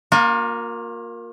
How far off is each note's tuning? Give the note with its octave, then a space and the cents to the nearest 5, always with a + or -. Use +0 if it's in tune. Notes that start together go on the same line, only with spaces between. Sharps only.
A#3 +0 F4 +40